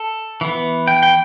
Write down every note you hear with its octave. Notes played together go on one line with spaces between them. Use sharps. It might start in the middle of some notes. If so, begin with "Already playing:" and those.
Already playing: A4
E3 B3
G5
G5